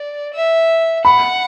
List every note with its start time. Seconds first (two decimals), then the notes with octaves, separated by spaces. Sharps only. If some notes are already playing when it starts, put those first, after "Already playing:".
Already playing: D5
0.34 E5
1.05 F#5 B5